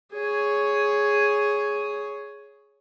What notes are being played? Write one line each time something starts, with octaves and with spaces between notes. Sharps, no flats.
G#4 C#5